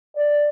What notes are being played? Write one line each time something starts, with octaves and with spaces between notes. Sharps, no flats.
D5